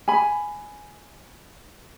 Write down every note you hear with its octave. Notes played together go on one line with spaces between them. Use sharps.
G#5 B5